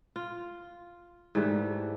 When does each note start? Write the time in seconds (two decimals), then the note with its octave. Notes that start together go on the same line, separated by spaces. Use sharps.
0.16 F4
1.35 G#2 E3 G3 A3